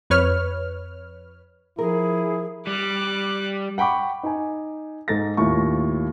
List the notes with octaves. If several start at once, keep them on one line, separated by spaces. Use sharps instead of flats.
F2 B4 C#5 F6
F3 E4 G#4 A#4
G3 D6 F#6
F#5 G5 B5 C#6 D6
D#4 G#5
G#2 D#4 A4 A6 A#6
D#2 A2 F4 C#6